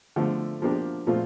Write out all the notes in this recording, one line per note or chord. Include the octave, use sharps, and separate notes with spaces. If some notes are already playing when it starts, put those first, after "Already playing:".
D3 F3 A3
F3 A#3 D4 G4 A#4
A#2 F3 A3 C4 F4